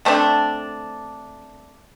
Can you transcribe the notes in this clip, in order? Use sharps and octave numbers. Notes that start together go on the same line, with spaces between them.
D3 A3 C4 D4